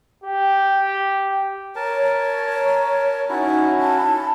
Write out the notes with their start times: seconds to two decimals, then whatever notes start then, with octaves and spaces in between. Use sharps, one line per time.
0.24 G4
1.76 A#4 C#5 A5
3.29 C#4 D#4 E4 F#4
3.79 A5